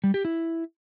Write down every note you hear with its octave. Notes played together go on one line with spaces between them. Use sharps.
G3
G4
E4